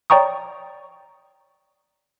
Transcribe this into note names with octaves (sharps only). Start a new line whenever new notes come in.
C#5 D5 G5 A#5 C#6 D#6